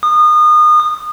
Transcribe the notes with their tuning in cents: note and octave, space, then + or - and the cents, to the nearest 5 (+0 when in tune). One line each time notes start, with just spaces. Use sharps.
D#6 -30